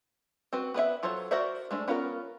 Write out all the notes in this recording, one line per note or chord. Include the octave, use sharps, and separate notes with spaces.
C4 F#4 B4
B3 B4 D5 E5
F#3 F4 A4 C5 C#5
F#4 A#4 C5 D5 E5
G#3 A3 D4
B3 C#4 F4 A4 A#4